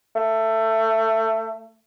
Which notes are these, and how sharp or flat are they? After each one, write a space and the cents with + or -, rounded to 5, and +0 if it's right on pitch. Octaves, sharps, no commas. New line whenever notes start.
A3 +20